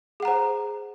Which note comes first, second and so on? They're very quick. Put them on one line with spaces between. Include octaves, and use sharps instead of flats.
G#4 F#5 A#5 C5